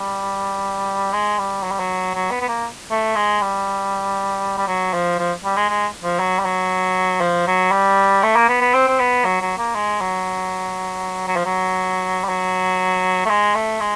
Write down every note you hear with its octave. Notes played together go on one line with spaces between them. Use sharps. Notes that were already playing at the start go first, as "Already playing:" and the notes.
Already playing: G3
G#3
G3
F#3
G3
F#3
F#3
B3
B3
A#3
A3
G#3
G3
G3
F#3
F3
F3
G3
G#3
G#3
F3
F#3
G3
F#3
F3
F#3
G3
A3
A#3
B3
B3
C4
C4
B3
F#3
F#3
A#3
G#3
F#3
F#3
F3
F#3
G3
F#3
A3
G#3
A3
G#3